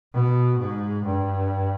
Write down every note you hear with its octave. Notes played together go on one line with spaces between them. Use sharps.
B2
G#2
G2